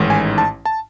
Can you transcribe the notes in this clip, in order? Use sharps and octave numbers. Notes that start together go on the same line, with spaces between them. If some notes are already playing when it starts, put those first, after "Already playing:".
Already playing: A1 G#2 D#3
G#5
A5
A5